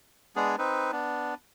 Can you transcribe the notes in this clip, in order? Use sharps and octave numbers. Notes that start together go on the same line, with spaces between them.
G#3 B3 D4 G#4
C4 D#4 B4
B3 D4